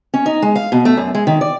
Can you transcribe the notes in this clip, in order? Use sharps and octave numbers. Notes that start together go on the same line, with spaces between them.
C#4
D#4
G#3
F5
B2
A3
F#2
G#3
D#3
D5